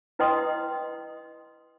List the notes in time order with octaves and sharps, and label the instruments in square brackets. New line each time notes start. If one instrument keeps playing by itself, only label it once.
[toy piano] E4 B4 D#5 G5 C6 D#6